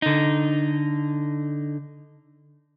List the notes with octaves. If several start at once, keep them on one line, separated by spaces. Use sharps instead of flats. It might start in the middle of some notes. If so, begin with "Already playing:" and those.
D3 D#4